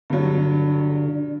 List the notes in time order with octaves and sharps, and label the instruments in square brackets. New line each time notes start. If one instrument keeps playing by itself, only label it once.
[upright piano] G2 F#3 [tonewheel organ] D3